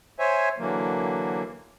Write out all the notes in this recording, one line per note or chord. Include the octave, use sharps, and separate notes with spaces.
C5 C#5 E5 G#5
D3 E3 F#3 A#3